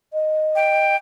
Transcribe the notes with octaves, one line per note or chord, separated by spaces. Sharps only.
D#5
G5